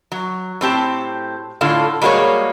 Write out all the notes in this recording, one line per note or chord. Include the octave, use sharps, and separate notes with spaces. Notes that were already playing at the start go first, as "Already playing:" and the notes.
F#3
A2 C4 G4 A5
A2 D3 F4 A4 F5
G3 G#3 A#3 F#4 G#4 C#5